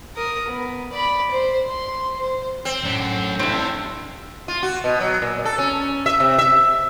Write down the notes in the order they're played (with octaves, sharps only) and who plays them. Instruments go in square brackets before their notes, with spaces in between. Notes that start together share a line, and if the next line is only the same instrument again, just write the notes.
[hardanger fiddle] A#4 D#6
B3
D5 B5
C5
C6
C5
[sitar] C4
[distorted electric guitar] F#2 [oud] A2 D4
[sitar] G2 [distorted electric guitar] E3 A4 [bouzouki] C4 E5
[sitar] F4
F#4
B2
F#3
A#2
A4
C#4
E5
C3
E5